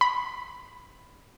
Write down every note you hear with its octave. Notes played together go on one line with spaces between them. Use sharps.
B5